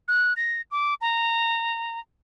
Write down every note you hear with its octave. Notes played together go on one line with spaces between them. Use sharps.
F#6
A#6
D6
A#5